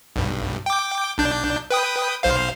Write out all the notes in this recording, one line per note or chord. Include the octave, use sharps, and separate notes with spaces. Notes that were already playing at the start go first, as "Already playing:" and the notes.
B1 G2
G5 D6
B1 D4 G6
B4 G5 D#6
B1 C5 F5